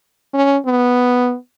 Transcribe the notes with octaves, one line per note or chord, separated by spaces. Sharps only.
C#4
B3